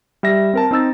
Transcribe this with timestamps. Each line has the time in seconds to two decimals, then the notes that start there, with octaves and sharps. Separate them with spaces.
0.23 G3 E5 A#6
0.53 C4 A#4 A5
0.71 C4 D#4 E6 A6